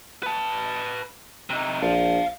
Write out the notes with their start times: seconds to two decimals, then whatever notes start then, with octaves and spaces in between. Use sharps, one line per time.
0.23 B4 A5
1.50 C3 D#4
1.82 A#1 F5 A5